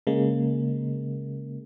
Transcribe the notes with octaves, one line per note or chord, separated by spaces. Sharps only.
C#3 G#3 A#3